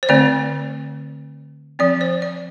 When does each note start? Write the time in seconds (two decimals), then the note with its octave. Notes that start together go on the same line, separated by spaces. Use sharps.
0.03 C5
0.09 D3 A3 C4 D5
1.79 F3 C4 D5
2.01 C5
2.22 D5